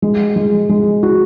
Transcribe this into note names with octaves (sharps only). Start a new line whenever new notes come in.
G#3
G#3
G#3
F#4